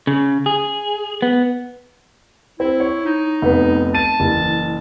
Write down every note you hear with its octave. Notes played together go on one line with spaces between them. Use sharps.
C#3
G#4
B3
C4 E4
C#5
D#4
F1 B3 B4
A5 D#7
F#1 E3